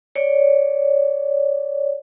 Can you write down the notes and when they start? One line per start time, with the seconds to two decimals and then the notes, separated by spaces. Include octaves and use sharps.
0.16 C#5 D5